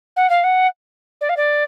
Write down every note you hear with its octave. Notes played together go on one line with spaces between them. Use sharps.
F#5
F5
F#5
D5
F5
D5